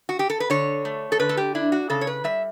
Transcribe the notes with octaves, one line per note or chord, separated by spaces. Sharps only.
F#4
G4
A4
B4
D3 C#5
A3
A4
D3 B4
A4
G4
D4 E4
F#4
C#3 A4
C#5
B4
G3 E5